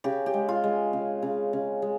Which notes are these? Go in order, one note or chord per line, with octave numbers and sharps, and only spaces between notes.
C#3 G4
G4
G#3
F4
G#3
C#3
C#3
C#3
G#3